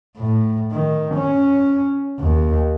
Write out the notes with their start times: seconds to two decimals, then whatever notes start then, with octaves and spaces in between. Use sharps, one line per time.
0.17 A2
0.72 D#3
1.15 C#4
2.19 D#2